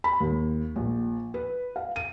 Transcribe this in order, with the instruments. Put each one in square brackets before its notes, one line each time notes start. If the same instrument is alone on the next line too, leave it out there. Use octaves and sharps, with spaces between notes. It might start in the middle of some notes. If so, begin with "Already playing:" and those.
[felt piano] B5
D#2
A#1
B4
F5
D#7